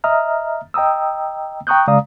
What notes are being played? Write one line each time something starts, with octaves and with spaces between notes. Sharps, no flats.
D#5 E5 A#5 D#6 F6
D#5 G5 A#5 D#6 E6
G5 A#5 C#6 D#6 F#6 G6
C#3 G#3 D5 F5 A#5 D#6